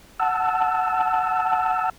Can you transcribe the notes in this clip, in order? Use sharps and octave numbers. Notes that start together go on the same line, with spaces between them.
F#5 A5 E6